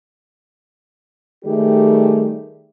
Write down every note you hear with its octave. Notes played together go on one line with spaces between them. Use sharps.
D#3 G3 A3 G4 G#4